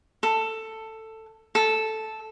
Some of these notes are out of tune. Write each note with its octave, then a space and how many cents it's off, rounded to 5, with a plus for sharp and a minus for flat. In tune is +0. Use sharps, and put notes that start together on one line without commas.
A4 +10
A4 -5